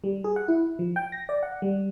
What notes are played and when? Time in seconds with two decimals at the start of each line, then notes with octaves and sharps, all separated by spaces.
0.04 G3
0.24 G#4
0.36 F#5
0.48 E4
0.79 F3
0.96 G5
1.12 A#6
1.29 D5
1.43 F#5
1.62 G3